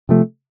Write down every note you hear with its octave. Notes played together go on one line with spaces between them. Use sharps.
C3 F3 A3